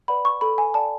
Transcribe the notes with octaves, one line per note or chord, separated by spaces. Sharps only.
B4 D5 F#5 B5
C#6
A4 B5
G#5
D5 F#5 A5